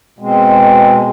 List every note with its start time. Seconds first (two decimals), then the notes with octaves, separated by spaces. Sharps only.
0.19 B2 G#3 C4